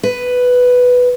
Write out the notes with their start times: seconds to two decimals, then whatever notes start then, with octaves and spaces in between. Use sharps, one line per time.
0.03 B4